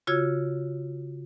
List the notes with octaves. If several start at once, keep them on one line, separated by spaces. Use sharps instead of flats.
C#3 F4 F#4 C#5 E6 G#6